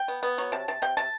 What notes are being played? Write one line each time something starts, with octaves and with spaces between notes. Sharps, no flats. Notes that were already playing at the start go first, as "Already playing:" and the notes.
Already playing: G5
B3
B3
F#3
C3 A5
C3 A5
C3 G5
C3 A5